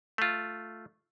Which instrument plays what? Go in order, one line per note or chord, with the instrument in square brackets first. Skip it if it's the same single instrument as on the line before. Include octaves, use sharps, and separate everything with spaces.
[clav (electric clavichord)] A3 F4